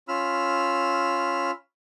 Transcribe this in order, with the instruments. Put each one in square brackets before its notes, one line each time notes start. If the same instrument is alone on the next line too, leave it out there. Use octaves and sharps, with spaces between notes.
[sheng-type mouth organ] C#4 F4 B5 E6 F6